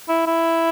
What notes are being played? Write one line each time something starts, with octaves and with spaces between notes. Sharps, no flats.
E4
E4